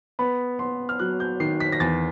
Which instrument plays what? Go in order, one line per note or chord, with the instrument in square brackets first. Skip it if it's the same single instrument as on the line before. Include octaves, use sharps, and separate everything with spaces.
[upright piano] B3 B5
B3 C6
F6
F#3 F#6
G6
D#3 C7
B6
A#6
E2 A6